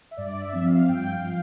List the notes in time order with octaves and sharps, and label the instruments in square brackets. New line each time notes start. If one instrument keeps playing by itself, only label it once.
[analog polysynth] E5
G2 D5
E5
F3 C4
F5
G2 G5
F5
F3